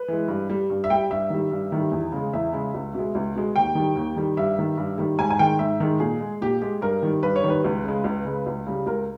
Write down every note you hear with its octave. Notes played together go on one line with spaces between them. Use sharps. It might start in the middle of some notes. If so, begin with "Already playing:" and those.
Already playing: B4
E3 G#3
G2
G3
G2
E5
G3 G5
G2 E5
D#3 G3
G2
D#3 G3
E2
C#3 G#3
E2 E5
C#3 G#3
C#2
B2 G#3
C#2
B2 G#3
D#2 G5
D#3 G3
D#2
D#3 G3
G2 E5
D#3 G3
G2
D#3 G3
G#2 G#5
G#5
D#3 G#3 G5
G#2 E5
D#3 G#3
A#2 G#4
G#3
A#2 G4
G#3 G4
G2 A#4
D#3 G3
G2 B4
C#5
D#3 G3
B4
C#2
C#3 G#3
C#2
C#3 G#3
C#2
C#3 G3
C#2 A#4